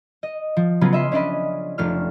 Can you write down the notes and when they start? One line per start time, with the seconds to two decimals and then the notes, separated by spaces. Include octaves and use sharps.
0.23 D#5
0.57 F3
0.81 C#3 F#3 B3 F4 G#4
0.93 D#5 E5 C6
1.12 C#4 D4 D5 D#5 B5
1.78 F1 A3 D4 F4 F6